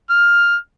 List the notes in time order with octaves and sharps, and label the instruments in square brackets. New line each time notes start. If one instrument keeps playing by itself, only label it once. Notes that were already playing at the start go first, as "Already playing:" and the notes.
[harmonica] F6